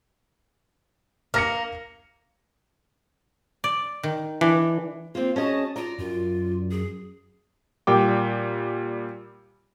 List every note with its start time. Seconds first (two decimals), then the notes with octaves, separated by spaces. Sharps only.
1.34 A#3 F6 A#6 C#7
3.64 D5
4.03 D#3
4.41 E3 D4
5.15 A#3 C4 F4
5.36 C#4 F#4 G#4 D#5 A5
5.76 F4 D5 A#5
5.98 F#2 F4
6.71 G#4
7.87 A#2 G3 G5 D6